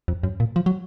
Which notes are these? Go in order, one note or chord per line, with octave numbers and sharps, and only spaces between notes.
F2
F#2
A#2
F3
F#3